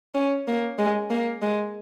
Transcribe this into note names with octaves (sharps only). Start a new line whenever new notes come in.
C#4
A#3
G#3
A#3
G#3